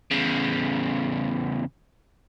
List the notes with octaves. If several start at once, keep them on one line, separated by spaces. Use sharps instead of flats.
E2 C#3